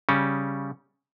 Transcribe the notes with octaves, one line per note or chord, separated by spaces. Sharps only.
C#3 G3 C#4